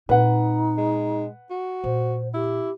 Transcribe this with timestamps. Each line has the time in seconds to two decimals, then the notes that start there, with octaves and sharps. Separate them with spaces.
0.09 A#2 C4 D#4 B4 F#5
0.78 G#3
1.51 F#4
1.84 A#2 C5
2.34 E4 G4